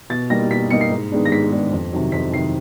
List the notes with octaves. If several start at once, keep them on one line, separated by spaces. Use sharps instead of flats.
B2 A6
G3 A#3 D#4 A#6
B2 B6
G3 A#3 D#4 C#7
C7
G#2
D#3 G#3 B3 D4
A#6
G#2 B6
D#3 G#3 B3 D4
F2
C3 D#3 F#3
F2 B6
C3 D#3 F#3 C7